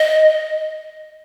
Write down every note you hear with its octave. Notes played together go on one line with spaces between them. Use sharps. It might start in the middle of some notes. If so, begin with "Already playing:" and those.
Already playing: D#5